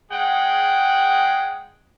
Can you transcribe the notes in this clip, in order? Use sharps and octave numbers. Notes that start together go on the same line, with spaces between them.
G#3 G#4 F#5 G5